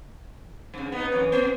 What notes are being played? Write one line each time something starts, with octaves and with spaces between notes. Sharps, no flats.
G2 C#3
B3 D#4
F#2 E3 C#5
B3